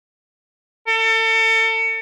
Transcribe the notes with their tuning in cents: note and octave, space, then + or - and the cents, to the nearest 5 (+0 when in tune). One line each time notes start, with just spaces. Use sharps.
A4 +35